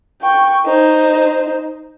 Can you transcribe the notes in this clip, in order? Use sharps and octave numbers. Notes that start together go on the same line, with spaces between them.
G5 C#6
D#4 C5